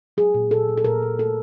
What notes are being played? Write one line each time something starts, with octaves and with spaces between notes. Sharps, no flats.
F#3 G#4
A#2
A#2 A4
A#2
A4
A#2 A#4
A#2
A3 A4